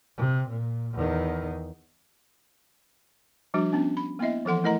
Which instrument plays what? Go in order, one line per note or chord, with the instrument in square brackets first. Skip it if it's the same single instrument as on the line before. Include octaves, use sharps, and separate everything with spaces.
[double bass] C3
A#2
E2 D#3
[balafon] F3 G3 D4 F#4
B3 C#4 D4
B5
A#3 B3 E4 D#5 E5
E3 F3 A4 F#5 C6
A3 E4 A#4 D#5 F#5 A#5